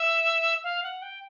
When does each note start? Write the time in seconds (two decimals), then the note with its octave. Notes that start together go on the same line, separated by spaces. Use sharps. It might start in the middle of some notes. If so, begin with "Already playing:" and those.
Already playing: E5
0.64 F5
0.83 F#5
1.02 G5